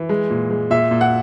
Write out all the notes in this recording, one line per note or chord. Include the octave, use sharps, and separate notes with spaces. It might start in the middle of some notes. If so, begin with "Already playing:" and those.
Already playing: E3
G#3
A#2
G#3
A#2 E5
A#2
F#5